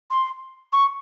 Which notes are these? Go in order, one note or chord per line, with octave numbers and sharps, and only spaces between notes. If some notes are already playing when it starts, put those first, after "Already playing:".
C6
C#6